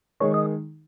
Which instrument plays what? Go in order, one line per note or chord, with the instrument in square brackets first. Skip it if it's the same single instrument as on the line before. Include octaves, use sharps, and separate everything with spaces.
[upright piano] D#3 G#3 D#4 G#4 [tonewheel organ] C#5
[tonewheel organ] D#5